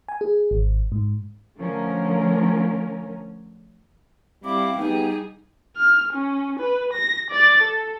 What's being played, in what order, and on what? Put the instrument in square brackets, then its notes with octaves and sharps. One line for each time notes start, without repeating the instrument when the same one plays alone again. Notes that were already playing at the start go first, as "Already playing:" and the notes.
[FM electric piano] G#5
G#4
G#1
G#2
[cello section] D3 F3 A3 C#4 A#4
[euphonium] G3 [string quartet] C4 E4 [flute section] F5 G5 D6
[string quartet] G3 G#4 [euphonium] B3 [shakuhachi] D#4 [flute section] G4
[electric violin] F6
C#4
B4
A#6
D5 A6
A4